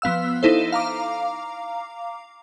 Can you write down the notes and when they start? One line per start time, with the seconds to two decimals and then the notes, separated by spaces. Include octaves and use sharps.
0.02 F3 B3 F5 E6
0.43 D#4 E4 A4 C5
0.72 F5 A#5 D6